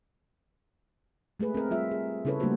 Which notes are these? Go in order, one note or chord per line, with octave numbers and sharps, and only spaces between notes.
G#3 A3 G#4 B4
C4 A#4
G3 F4 E5
G#4
C#3 C#4 E4 A4 B4 C#5
G3 A3 A#3 D4 F#4 C5